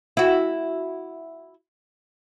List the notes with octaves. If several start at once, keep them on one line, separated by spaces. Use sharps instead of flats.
E4 F#4